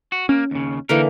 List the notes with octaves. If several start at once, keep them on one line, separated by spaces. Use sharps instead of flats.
F#4
A#3 C#4
D#2 C#3
D3 E3 A#3 D#4 A#4